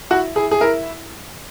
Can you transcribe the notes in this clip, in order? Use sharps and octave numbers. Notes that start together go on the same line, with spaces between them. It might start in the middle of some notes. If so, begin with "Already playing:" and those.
E4 F#4
E4 G#4
G#4
E4 A#4